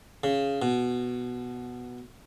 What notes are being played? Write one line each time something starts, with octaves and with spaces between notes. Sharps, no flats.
C#3
B2